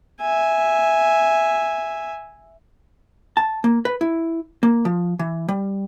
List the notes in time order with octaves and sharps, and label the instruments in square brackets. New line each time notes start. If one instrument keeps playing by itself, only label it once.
[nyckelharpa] E5 G#5
[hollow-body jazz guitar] A5
A#3
B4
E4
A#3
F3
E3
G3